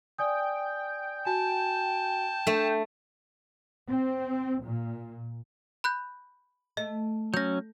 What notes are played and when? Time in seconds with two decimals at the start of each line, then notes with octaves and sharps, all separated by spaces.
0.18 D5 G5 G#5 D#6
1.25 F#4 G#5 A5
2.47 A3 D4 G6
3.89 C4
4.64 A#2
5.84 B5 F#6 G6
6.77 A3 D#5
7.34 F#3 C#4 G6 A#6